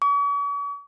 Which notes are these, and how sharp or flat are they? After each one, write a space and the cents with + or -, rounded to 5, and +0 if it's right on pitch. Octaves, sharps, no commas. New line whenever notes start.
C#6 +45